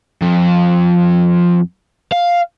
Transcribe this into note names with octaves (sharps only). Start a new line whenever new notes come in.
F2
F5